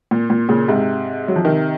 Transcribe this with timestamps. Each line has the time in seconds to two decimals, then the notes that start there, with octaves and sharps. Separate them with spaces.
0.11 A#2
0.30 A#2
0.49 A#2 C#3
0.68 G#2 C3
1.28 F#3
1.36 F3
1.45 C3 D#3